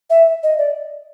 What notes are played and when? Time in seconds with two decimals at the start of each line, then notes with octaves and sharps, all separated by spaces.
0.10 E5
0.43 D#5
0.58 D5